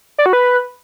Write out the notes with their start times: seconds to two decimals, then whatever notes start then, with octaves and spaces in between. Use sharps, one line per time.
0.18 D5
0.26 F#4
0.33 B4